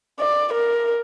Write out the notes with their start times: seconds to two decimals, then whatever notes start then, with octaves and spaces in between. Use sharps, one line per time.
0.20 D5
0.54 A#4